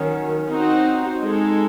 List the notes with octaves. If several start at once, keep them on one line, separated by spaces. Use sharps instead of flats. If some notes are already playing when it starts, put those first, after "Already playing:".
Already playing: D#3 F#3 C#4
C4 D#4 F#4 C5
G#3 D#4 A4